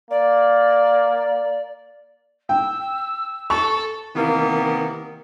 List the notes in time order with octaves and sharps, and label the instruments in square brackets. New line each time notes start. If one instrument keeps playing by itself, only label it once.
[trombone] A#3 [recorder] D5
[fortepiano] G5 [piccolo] E6
[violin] A4 [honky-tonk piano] C#6
[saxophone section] C3 D#3 E3 A#3 B3